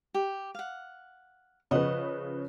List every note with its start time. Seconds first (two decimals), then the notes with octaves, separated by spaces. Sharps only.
0.14 G4
0.55 F5 F#5
1.71 C#3 F3 B4 D#5 F#5 C#6